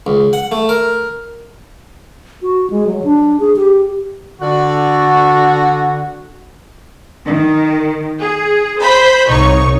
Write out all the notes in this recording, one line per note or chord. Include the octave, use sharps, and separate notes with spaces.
C#2
F#5
A3
A#4
F#4
G#3
F#3
D4
G#4
G4
D3 F#4
D#3
G#4
C5 B5 G6
C2 D#4 C#5 C#6